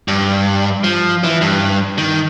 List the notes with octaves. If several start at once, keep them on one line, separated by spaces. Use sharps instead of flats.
G2
F3
E3
G2
D#3